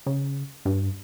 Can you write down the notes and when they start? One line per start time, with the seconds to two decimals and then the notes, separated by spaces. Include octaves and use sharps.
0.06 C#3
0.65 G2